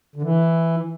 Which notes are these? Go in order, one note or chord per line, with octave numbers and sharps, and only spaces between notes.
D3
E3